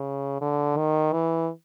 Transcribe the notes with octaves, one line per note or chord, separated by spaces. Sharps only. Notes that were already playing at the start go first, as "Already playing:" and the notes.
Already playing: C#3
D3
D#3
E3